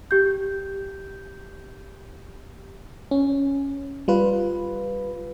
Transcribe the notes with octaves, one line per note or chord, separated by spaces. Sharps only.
G4 G6
C#4
G3 F4 B4